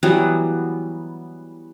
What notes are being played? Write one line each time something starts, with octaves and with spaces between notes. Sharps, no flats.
E3 F#3 G3 B3